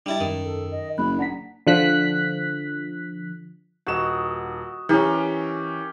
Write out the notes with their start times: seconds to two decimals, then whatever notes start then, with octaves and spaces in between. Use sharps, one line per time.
0.06 G3 D4 E4 D#5 A5
0.20 F#2 D#3
0.45 A4
0.72 D#5
0.98 F#1 B5 F#6
1.19 D4 F#5 A#5 B6
1.67 D3 F3 F#6 B6
3.87 D#1 F#4 D#5 E7
4.89 E3 C#4 G4 A#4